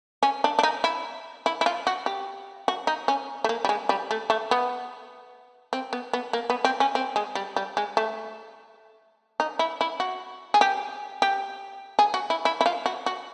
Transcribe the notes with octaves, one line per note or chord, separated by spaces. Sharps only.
C#4
D4
D4
D#4
E4
E4
E4
F4
F#4
G4
F#4
D#4
C#4
A3
A#3
G3
G#3
G3
A3
A3
B3
C4
B3
B3
A#3
B3
C4
C#4
C4
G#3
G3
G3
G#3
A3
D#4
E4
E4
F#4
G#4
G4
G4
G#4
F#4
E4
E4
E4
F4
F#4
F#4